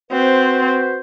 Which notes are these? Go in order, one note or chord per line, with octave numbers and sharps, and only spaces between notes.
C4 F#4 B4 C5